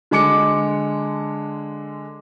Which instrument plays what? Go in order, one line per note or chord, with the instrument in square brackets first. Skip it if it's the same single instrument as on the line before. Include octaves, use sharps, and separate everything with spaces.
[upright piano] D3 G#3 D6 C#7